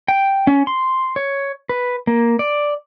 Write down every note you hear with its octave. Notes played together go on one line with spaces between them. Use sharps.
G5
C#4
C6
C#5
B4
A#3
D5